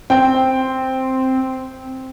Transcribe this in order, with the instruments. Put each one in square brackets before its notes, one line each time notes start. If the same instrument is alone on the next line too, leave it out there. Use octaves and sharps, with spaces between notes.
[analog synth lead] C4 [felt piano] G5